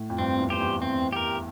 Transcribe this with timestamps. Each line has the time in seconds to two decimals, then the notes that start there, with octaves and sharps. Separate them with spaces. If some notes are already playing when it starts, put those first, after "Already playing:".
Already playing: A2
0.10 F2
0.18 G2 C4
0.33 F2
0.39 E2
0.50 G4 C5
0.60 E2
0.82 C4
1.13 G4 A#4